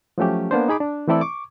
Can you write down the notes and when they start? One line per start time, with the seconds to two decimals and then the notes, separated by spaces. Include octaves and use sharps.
0.18 F3 F#3 A3 C#4 G4
0.51 A#3 B3 D4 C5
0.68 D#4 G#4 B5 D6
0.80 D4
1.08 E3 A3 C4 E4 A4 D5
1.21 C#6 D6